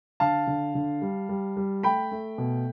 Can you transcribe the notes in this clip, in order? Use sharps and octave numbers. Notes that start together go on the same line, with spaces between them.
D3 F5 A5
D3
D3
G3
G3
G3
A3 G5 B5
A3
B2